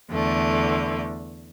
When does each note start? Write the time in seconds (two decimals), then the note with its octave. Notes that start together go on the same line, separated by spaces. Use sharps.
0.11 E2 D3 A3